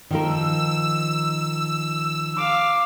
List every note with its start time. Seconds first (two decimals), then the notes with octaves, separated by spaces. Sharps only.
0.10 D#3 F3 A#4 E6
2.37 F5 D6